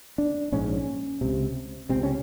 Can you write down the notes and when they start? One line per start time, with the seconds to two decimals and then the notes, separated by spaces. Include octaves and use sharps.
0.18 D4
0.52 A#1 G#2 C#4
1.21 C#2 C3
1.89 C#2 C3 C4
2.03 C#4